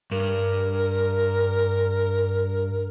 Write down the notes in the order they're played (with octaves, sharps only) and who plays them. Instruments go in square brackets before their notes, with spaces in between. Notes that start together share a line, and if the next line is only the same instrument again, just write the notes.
[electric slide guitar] G2 [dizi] A#4